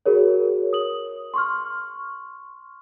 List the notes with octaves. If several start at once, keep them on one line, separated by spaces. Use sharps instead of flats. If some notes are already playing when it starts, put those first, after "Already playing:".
F#4 G#4 A#4 C#5
D#6 F#7
C6 C#6 F6